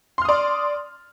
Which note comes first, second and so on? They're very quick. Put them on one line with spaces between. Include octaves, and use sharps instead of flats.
C6 F6 D#6 D5